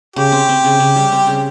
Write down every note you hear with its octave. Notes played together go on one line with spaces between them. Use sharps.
C#3 G4
C4
C4
C#3
C#3
G3
C4
C#3